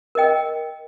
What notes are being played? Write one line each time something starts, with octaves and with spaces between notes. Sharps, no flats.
A#4 D#5 G5